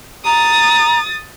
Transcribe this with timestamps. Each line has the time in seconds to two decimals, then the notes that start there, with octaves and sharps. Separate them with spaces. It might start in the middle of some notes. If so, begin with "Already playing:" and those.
0.25 A#5 D#6 A6